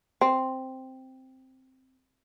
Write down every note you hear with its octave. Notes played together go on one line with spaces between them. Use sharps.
C4